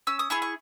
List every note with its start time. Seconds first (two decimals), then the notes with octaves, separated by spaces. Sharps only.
0.07 C#4 E6
0.19 D#6
0.30 E4 G#4 C#6
0.42 C#6